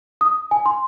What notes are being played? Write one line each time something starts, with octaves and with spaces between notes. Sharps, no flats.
D#6
G#5
C6